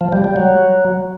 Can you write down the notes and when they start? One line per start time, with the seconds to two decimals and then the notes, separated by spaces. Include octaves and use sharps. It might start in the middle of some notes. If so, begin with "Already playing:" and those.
0.01 F3
0.12 G3
0.24 G3
0.36 F#3